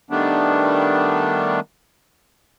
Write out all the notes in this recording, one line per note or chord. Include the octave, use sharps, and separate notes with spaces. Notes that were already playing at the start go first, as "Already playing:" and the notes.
D#3 G3 A3 B3 D4